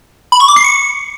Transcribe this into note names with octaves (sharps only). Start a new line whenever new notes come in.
B5
C#6
D6
C7
C#7